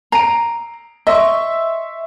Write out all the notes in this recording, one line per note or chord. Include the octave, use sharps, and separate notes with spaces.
A#5 C7 D7
D#5 E5 C6 C#6